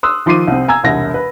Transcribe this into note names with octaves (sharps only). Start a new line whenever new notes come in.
C6 D#6 E6 F#6
D#3 F3 C6 D6 C7 D#7
C2 C4
G#5 A#5 E6 G#6
E1 C2 A#6
B4